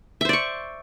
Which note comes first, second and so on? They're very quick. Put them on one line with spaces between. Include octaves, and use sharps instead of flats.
E5 C5 D5 C#6